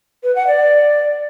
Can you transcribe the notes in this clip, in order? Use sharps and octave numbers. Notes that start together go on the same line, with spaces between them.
B4
F#5
D5